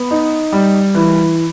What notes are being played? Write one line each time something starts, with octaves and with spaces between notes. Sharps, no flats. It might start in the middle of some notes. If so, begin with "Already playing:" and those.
Already playing: B3
D#4
G3
E3